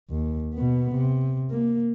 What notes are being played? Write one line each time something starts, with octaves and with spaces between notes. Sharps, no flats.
D#2
B2 B3
C3
A#3